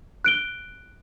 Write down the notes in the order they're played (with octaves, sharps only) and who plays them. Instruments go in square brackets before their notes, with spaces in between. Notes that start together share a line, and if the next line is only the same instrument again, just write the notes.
[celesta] F#6 D7 G7